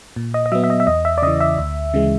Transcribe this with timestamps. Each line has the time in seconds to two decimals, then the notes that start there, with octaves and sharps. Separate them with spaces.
0.16 A#2
0.34 D#5
0.46 D#5
0.52 F#3 E5
0.55 B3
0.64 E5
0.70 D#5
0.80 E5
0.87 E2 D#5
1.05 E5
1.18 D5
1.22 C#3 E3 D#5
1.41 E5
1.58 D2
1.94 C#3 E3 G#3